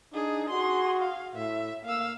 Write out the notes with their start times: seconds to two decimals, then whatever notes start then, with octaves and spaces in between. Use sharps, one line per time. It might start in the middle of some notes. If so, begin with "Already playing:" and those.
0.13 D4 D#4 G#4
0.50 F#4 G#4 C6
1.00 F5
1.35 A2 E5
1.85 A#3 F5 E6